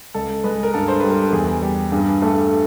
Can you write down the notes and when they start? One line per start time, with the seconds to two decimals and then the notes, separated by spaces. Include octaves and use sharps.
0.14 C#2 A4
0.44 G#3 B4
0.63 A#4
0.74 G2 A4
0.88 C5
1.00 G3 B4
1.10 A#4
1.22 A4
1.32 E2 G#4
1.62 G3 G4
1.92 G2 G#4
2.21 A3 A4